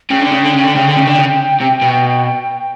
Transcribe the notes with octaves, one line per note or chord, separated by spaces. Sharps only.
C#3 G5
D3
C#3
D3
C#3
D3
C#3
D3
C#3
D3
C#3
C3
B2